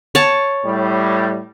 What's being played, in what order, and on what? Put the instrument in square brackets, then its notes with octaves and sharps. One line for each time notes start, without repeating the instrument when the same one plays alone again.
[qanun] C#5 A5
[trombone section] A2 G3